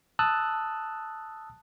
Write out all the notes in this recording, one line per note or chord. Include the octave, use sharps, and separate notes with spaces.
A5 D#6 E6 F#6